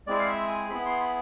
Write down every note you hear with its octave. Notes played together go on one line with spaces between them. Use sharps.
G#3 C4 E4 G#4 D5
F5
E5
G#5
B3 E4 G#4 B5
C6
B5